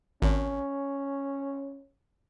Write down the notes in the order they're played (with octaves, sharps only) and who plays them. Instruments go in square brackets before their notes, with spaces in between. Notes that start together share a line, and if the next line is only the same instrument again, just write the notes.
[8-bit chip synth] G#1 [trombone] C#4